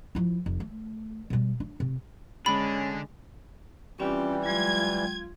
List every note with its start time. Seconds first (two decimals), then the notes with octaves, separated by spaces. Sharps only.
0.15 F3 E4
0.46 F1
0.60 A3
1.30 B2 G3
1.60 D4
1.80 C3
2.46 D3 G#3 C#4 D4 B5
4.00 E3 G3 C4 C#4 F4 G4
4.46 F#3 G#3 F4 G5 G#6